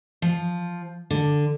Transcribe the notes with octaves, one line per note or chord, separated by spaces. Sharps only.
F3
D3